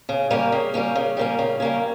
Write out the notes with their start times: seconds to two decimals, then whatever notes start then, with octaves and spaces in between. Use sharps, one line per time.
0.09 C#3
0.30 G3 A#3 C#4
0.52 C#3
0.74 G3 A#3 C#4
0.95 C#3
1.17 G3 A#3 C#4
1.39 C#3
1.60 G3 A#3 C#4